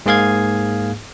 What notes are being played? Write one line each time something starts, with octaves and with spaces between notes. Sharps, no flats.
G#2 A#3 G#4 F5 G#6